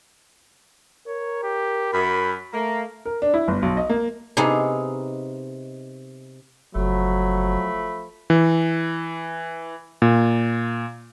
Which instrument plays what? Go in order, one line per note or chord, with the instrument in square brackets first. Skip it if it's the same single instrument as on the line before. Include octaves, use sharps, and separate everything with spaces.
[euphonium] A#4 [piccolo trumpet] C#5
[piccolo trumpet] G4
[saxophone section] F#2 [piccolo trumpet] B5
[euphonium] A3 [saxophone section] A#3 [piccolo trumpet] A#5
[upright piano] A#4
D4
E4
G1
B1
D#5
A#3
[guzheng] C3 B3 D#4 G#4
[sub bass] F#1 [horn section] F3 A3 B5 [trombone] F#3
[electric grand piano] E3
A#2